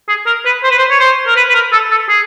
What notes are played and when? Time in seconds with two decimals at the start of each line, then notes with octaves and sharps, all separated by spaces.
0.08 G#4
0.26 A#4
0.45 B4
0.63 C5
0.71 B4
0.78 C5
0.90 C#5
1.00 C5
1.27 A#4
1.36 B4
1.49 B4
1.54 A#4
1.72 A4
1.91 A4
2.09 G#4